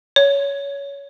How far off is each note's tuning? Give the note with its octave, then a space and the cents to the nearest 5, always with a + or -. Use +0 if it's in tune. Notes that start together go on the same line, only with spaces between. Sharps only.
C#5 +20